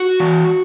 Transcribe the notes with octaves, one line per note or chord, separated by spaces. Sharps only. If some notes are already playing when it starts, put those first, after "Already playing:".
Already playing: F#4
E3